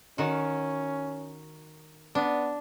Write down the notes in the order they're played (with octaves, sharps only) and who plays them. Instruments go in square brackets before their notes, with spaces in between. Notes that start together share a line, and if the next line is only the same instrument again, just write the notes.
[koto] D#3 F#4 [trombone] C#4
[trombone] B3 [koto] D4